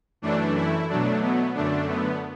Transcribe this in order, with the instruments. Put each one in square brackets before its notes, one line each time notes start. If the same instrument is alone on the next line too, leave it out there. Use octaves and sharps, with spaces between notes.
[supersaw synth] F#2 E3 A3 D4
E4
B2 F#3 A3 D4
B3
F#2 D3 A3 D4
B3